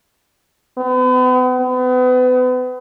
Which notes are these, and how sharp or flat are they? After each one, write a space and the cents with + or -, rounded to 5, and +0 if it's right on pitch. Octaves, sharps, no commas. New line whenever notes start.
B3 +40
B3 +35